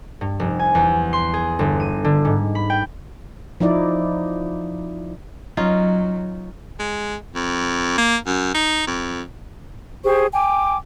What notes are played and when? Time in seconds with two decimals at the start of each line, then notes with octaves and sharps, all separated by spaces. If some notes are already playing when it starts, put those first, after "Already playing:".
0.21 G2
0.40 F1
0.59 G#5
0.75 E2
1.13 C6
1.34 G#4
1.59 G1
1.80 D#7
2.04 D3
2.25 G#2
2.55 B5
2.70 G5
3.60 F3 D#4 E4 D5
5.57 F#3 C#4 D#4 F4
6.80 G#3
7.35 F2
7.98 A#3
8.27 F#2
8.55 D#4
8.87 F2
10.04 G4 G#4 C5 C#6
10.32 G5 G#5 D6